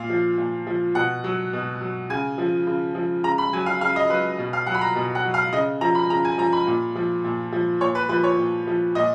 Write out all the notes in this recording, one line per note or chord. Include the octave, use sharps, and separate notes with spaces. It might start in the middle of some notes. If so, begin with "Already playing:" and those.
Already playing: A#2 F5
F3
A#2
F3
B2 F#5
F#3
B2
F#3
C#3 G#5
F3
C#3
F3
C#3 A#5
B5
F#3 G#5
F5
C#3 F5
D#5
F#3 B4
B2
F5
F#3 F#5
B5
A#5
B2
F#5
F#3
F5
C#3 D#5
F3 A#5
B5
C#3 A#5
G#5
F3 A#5
B5
A#2
F3
A#2
F3
A#2 C#5
B4
F3 B4
C#5
A#2
F3
A#2 D#5